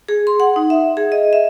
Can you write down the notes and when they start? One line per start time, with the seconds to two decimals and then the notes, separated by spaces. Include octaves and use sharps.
0.09 G#4
0.27 C6
0.40 F#5
0.56 D#4
0.70 E5
0.97 G#4
1.12 D#5
1.33 E5